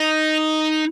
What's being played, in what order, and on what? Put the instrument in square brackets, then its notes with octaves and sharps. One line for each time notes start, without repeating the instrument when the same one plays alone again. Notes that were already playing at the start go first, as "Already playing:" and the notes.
Already playing: [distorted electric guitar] D#4